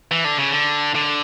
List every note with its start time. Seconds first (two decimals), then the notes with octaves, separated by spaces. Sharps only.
0.11 E3
0.24 D3
0.38 C#3
0.51 D3
0.95 D3